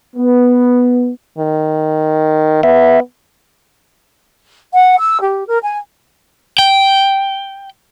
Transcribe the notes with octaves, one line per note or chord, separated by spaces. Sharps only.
B3
D#3
B3 E5
F#5
E6
G4
A#4
G#5
G5